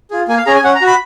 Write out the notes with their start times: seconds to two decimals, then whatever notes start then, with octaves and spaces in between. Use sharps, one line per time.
0.11 F4 G#4
0.28 A#3 G#5
0.38 F5
0.46 C#4 G#4 A#5
0.55 G#5
0.64 C#4 F#5
0.75 A#5
0.81 F#4
0.87 B5